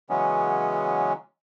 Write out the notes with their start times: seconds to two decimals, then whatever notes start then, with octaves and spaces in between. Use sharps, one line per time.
0.10 C#3 E3 F#3 G#3 B3 C#4